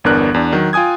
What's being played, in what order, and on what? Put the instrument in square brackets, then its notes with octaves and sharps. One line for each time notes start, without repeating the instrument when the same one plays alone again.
[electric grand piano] G1 E2 B3 D4 A#4 F#6
E2 D4
D#3 F#3
F4 G5 G#5 D#6 G#6